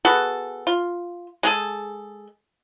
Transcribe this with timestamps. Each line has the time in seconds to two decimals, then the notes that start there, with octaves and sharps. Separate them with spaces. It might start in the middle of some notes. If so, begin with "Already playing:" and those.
0.05 B3 F#4 G#4 A4
0.67 F4
1.43 G#3 G#4 A4